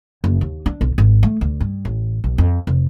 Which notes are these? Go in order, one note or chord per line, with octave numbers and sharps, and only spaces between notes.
F#1
D#2
D4
B1
G#1
A3
D2
G2
A1
B1
F2
F1